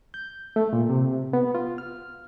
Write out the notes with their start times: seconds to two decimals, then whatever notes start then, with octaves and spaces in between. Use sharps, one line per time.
0.14 G6
0.56 A3
0.73 A#2
0.89 C3
1.33 B3
1.55 F4
1.78 F6